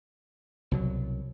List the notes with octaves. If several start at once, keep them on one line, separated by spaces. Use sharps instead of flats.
C2 B2 F#3